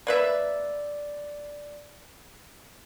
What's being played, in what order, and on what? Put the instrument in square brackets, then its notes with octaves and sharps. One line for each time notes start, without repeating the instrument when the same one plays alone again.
[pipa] A#3 B4 E5 [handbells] D5